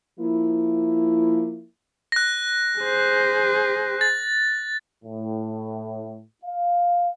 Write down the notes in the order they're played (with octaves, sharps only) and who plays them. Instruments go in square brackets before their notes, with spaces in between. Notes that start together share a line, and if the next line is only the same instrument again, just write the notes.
[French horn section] F3 A#3 E4
[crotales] F#6 A#6
[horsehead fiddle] G#4 C5
[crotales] A6
[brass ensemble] A2
F5